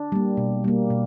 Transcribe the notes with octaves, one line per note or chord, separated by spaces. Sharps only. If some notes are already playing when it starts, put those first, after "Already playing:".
Already playing: D4
G3 A#3
B2
G3 A#3
B2